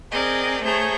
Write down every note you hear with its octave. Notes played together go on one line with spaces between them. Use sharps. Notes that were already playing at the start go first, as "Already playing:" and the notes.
C4 G#4 A#4 D5 D#5 G5
A3 G#4 C5 C#5 A#5 G6